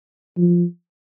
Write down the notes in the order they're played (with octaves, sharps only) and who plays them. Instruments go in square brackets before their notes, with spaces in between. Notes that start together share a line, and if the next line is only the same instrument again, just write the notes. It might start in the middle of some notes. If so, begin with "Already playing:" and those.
[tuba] F3